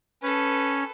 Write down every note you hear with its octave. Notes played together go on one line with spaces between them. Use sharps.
C#4 A4 B4